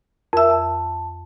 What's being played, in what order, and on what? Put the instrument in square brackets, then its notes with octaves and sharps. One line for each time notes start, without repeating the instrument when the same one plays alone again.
[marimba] F2 E5 [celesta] A#4 E6
[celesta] A5